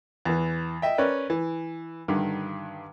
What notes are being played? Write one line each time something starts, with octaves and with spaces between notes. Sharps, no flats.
E2 E3
D#5 E5 G5
C#4 A#4 B4 D5
E3
G2 D3 D#3